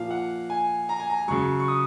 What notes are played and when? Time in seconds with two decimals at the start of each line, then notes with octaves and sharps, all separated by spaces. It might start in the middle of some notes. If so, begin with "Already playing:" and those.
Already playing: A#2 F3 F5
0.10 F#5
0.50 G#5
0.89 A#5
1.00 G#5
1.10 A#5
1.28 C#3 F#3 C#6
1.60 C#6
1.68 D#6